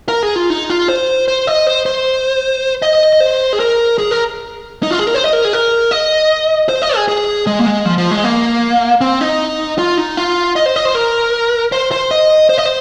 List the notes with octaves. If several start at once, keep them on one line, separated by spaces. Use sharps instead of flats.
A#4
G#4
F4
D#4
F4
C5
C5
D#5
C5
C5
D#5
C5
G#4
A#4
G#4
A#4
D#4
F4
G#4
A#4
C5
D#5
A#4
G#4
A#4
D#5
C5
D#5
G#4
G#4
G#3
A#3
G#3
F3
F3
G#3
A#3
C4
D#4
F4
D#4
F4
D#5
C5
D#5
C5
A#4
C5
C5
D#5
C5
D#5
C5